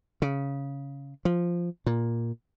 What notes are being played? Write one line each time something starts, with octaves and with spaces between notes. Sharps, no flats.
C#3
F3
A#2